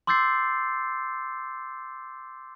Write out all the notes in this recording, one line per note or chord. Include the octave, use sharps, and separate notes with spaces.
C6 D6 E6 G6 A6 C7